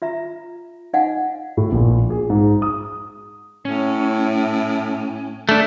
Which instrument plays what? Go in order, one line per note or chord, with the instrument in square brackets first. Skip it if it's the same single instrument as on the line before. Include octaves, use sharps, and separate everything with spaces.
[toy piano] F4 E5 A#5
D#4 D#5 F5 F#5 G#5
[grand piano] A2
A#1
G#4
G#2
D#6
[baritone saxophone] A2 [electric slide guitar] C#4
[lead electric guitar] A3 D4